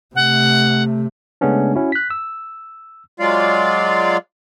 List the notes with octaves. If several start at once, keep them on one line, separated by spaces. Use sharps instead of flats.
C3 A3 F#5
C#3 G#3 A3 B3 C#4 D4
C#4 E4 F#4
F#6 B6
E6
F#3 G#3 F4 D5 F5